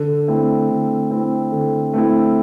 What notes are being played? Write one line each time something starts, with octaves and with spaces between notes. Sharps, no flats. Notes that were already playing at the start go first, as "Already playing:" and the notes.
Already playing: D3
A3 C4 E4
D3
A3 C4 E4
D3
A3 C4 E4